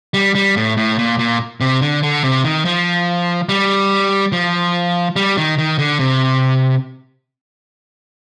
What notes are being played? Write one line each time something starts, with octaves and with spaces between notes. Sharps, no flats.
G3
G3
A2
A2
A#2
A#2
C3
D3
D3
C3
D#3
F3
G3
F3
G3
D#3
D#3
D3
C3